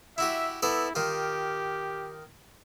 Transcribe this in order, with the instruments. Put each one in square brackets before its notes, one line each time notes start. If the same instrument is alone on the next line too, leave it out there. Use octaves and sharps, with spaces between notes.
[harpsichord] E4 F#4 G4 [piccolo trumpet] E5
[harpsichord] B3 A4 D5 [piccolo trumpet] E4
[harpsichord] D#3 F4 [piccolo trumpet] G4